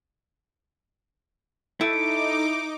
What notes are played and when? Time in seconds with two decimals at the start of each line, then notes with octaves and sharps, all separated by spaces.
1.81 A3 D#4 E4 D6 D7